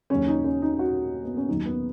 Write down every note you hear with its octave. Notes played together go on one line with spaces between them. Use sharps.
D#2 C#3 F#3 C#4
D#4
C#4
D#4
F#4
B3
C#4
D#2 D#3 F#3 D#4
B3